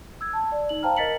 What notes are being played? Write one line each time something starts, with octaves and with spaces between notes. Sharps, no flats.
E6 G#6
A5
D5
D#4 F#7
C5 F5 G5 A5 A#5 F6
A#4 D#5 A6 B6 C#7 F#7